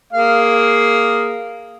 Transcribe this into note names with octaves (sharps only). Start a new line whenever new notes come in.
A#3 G#4 F5